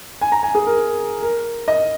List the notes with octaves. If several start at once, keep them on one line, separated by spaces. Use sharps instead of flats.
G#5
A#5
G#5
G#4
A#4
A#4
D#5